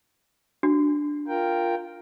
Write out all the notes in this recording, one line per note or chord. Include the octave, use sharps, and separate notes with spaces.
D4 F#4
F4 A#4 G5